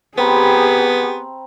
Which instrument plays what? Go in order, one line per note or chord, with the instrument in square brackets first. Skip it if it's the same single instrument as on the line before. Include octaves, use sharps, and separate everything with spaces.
[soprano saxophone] B3 [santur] C4 A#5 B5 [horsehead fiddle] G4 G#4